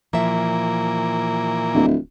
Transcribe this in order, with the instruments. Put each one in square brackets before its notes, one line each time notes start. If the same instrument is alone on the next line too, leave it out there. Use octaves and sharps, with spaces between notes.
[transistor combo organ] A#2 E3 A#3 [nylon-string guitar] F3 E5
[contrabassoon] D1